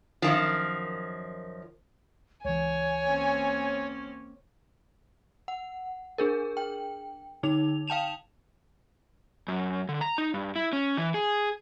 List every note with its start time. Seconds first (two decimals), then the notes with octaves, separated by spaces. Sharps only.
0.22 F#2 D#3 F3
2.45 C#2 E3 C#5 G#5
3.05 A#3 C4 C#4
5.48 F#5
6.18 D4 G#4 A#4
6.57 G5
7.43 D3 D#4 F7
7.88 F5 G5 A5 E7 F7
9.48 F#2
9.89 D3
10.01 A#5
10.18 D#4
10.34 G2
10.55 E4
10.73 C#4
10.97 E3
11.14 G#4